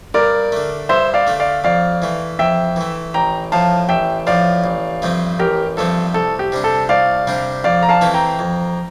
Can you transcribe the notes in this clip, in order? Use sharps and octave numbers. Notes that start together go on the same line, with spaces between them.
G2 A#4 D5
D3 A3
G2 C5 E5
D5 F5
D3 A3
D5 F5
F2 D5 F5
E3 A3
F2 E5 G5
E3 A3
A1 G5 A#5
A2 F3 F5 A5
A1 E5 G5
A2 F3 D5 F5
A1
G2 F3 A3 C4
A1 G4 A#4
G2 F3 A3 C4 A4
C2 A4
G4
C3 G3 D4
A4
C2 D5 F5
C3 G3 D4
F2 D5 F5
A#5
F5 A5
E3 A3 C4 E4
G5 A#5
F2